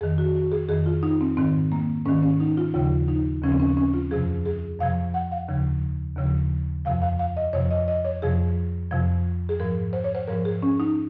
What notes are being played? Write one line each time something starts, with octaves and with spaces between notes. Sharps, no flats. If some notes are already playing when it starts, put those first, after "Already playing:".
F2 D#3 G#4
F#4
F#4
G#4
F2 D#3 G#4
F4
D#4
C4
G#2 D#3 C4
A#3
G#2 D#3 C#4
C#4
D#4
F4
D#2 C#3 F3 F4
D#4
D#2 C#3 F3 C#4
C4
C#4
C#4
F4
F2 C3 F3 G#4
G#4
F2 C3 F3 F5
F#5
F5
D#2 C#3 F3
D#2 C#3 F3
F2 C3 F3 F5
F5
F5
D#5
F2 C3 F3 C#5
D#5
D#5
C#5
F2 C3 F3 G#4
F2 C3 F3
G#4
G#2 F3 A#4
C5
C#5
C5
G#2 F3 A#4
G#4
C#4
D#4